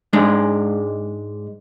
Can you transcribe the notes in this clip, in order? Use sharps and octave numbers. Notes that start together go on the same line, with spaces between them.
G#2 G#3 D4